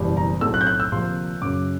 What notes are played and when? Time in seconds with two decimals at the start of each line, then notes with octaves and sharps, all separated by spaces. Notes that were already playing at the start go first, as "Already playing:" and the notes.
Already playing: F#1 E2 B2 G3
0.17 A#5
0.41 B1 A2 F#3 A3 C4 E6
0.54 F#6
0.61 G6
0.67 F#6
0.80 E6
0.92 D2 C3 F3 A#3 C6
1.41 F#2 C#3 F#3 D6